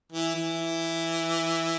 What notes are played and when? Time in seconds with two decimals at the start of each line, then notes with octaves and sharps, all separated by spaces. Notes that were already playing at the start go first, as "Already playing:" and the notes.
0.12 E3
0.35 E3